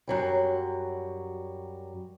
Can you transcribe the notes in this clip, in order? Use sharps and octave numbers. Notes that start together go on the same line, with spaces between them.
F#2 F#3 G3